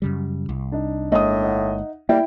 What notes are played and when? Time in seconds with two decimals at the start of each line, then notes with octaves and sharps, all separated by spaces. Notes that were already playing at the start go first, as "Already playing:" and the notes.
0.02 F#2 C#3 G3
0.49 C2
0.72 D4 D#4
1.12 G1 A2 G#3 A#3 D#5 D#6
1.43 D#4 E5 F#5
2.09 G3 A#3 E4 G5